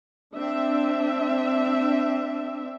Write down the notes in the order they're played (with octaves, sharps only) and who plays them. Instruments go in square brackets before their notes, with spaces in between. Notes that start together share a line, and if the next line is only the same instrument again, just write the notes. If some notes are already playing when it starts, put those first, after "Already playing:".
[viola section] C4 D4 E5